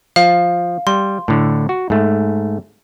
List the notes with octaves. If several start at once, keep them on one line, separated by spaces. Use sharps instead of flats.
F3 F5
G3 C6
A2 D3
F#4
G#2 A3